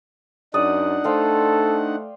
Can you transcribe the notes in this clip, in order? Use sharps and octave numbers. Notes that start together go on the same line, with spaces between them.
F#2 D4 D#4 D5 F#5 D#6
A3 A4 C5 F5 G5